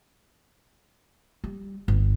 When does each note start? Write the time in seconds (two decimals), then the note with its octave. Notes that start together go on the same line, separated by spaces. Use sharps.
1.44 G3
1.88 G1